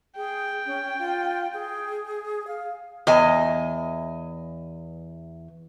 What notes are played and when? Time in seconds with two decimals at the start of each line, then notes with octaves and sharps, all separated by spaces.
0.16 G#4 G5
0.66 C#4
0.99 F4
1.54 G#4
2.48 F5
3.07 E2 D#5 G#5